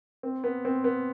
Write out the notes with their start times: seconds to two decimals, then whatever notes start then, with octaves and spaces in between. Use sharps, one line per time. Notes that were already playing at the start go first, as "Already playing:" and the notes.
0.23 C4
0.44 B3
0.65 C4
0.84 B3